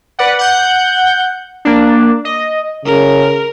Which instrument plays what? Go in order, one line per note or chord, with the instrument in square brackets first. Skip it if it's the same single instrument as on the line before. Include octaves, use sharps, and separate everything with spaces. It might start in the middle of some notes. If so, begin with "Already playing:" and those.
[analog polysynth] B4 D5 F#5
F#5 G6
A#3 D4
D#5
[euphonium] C#3 [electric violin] A#4